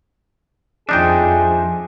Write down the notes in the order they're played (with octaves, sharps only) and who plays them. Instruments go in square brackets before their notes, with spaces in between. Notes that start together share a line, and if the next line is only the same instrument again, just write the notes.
[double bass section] F2 [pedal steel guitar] F3 E5 [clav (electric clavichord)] D4 D#4 G5 [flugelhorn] G#4